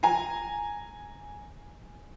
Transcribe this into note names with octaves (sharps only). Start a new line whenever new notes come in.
G#5 A#5